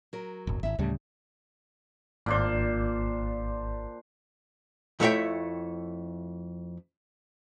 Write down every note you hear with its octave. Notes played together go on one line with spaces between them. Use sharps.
F#3 A#4
D1 G1
G#1 E4 E5
D2 A2 C#3 G3
G#1 A#2 D4 C5
F2 A3 E4 C#5 E5 G5